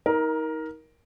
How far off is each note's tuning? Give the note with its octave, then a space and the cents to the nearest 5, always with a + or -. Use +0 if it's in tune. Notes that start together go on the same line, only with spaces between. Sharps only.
D#4 +35 A#4 +10